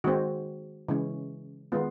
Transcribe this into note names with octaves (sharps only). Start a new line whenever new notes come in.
D#3 G#3 C4 F#4
C#3 E3 G#3 C#4
D#3 G#3 B3 F4